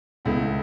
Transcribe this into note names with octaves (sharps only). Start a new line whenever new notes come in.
C#2 B2 A3 E4